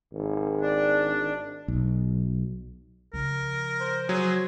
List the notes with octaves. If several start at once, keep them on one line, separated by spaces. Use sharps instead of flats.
G#1
D4
B1
C#3 F3 A#4
C5
F#3 G#4